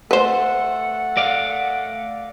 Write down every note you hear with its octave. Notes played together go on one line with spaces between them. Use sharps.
A3 A4 B4 C5 F#5
D5 F5